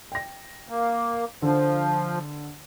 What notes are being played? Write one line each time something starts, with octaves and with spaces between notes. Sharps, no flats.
G5 A#6
A#3
D3 F3